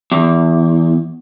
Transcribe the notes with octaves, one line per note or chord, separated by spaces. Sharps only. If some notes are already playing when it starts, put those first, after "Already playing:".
E2